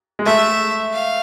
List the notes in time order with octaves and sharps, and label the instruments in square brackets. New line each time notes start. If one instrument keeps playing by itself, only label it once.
[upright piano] G#3
[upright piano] A3 [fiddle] E5
[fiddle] F5